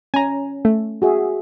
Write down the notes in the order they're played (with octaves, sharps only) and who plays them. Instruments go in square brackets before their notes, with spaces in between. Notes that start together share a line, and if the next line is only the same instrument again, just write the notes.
[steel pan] C#4 [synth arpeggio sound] G#5 A#5
[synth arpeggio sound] A3
[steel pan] F#4 G#4 E5